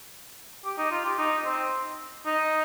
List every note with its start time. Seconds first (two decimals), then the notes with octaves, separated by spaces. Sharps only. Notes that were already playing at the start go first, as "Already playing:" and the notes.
0.65 G4
0.78 D#4
0.91 F4
1.05 G4
1.19 D#4
1.45 C4
2.26 D#4